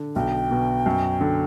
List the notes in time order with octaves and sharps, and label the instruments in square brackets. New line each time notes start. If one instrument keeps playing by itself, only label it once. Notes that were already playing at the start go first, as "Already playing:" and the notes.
Already playing: [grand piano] D3
[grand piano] B1 [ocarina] G5
[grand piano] B2
F#2
D3